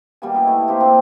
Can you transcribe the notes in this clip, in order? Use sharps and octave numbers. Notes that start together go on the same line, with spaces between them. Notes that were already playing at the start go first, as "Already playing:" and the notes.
B2 G3 A#3 G#5
D#4 E4 B4
A3 G#5
A#3 C4 G4 C5
A#2 A#3 C4 D4